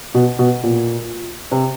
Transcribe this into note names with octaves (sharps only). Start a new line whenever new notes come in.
B2
B2
A#2
C3